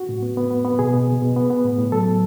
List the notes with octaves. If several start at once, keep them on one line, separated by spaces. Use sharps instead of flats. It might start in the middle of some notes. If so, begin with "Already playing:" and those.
Already playing: F#4
A2
B3
B3
B3
B3
B2 G#4
B2
B2
B2
B3
B3
A2
A2
F#3 A4
B3